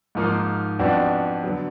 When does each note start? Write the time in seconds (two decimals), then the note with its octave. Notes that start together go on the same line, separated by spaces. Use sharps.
0.15 G#2 F3 A#3 D#4
0.79 F2 F3 B3 D4 F#4
1.43 D3 F#3 B3